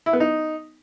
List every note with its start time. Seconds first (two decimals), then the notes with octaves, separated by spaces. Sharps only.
0.06 E4
0.13 B3
0.20 D#4